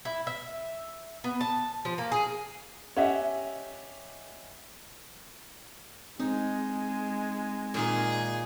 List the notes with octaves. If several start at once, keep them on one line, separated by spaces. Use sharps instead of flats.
E4
E5
B3
A5
F3
A#3
G#4
C#4 G4 D#5 E5 F#5
G#3 C4 D#4
A#2 D#3 A#3 G#4